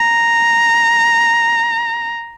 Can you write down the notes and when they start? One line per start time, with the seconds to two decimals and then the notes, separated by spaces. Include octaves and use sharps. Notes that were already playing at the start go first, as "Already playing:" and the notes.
Already playing: A#5